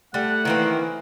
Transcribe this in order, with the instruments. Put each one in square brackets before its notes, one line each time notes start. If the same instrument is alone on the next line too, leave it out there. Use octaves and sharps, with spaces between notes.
[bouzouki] G3 [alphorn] A3 [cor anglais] F#5
[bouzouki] D#3 A#3 C4 [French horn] E3